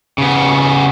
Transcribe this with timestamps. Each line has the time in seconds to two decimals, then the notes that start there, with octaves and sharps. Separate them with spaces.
0.18 C#3 B3